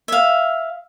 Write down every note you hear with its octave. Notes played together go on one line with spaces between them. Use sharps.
E5 F5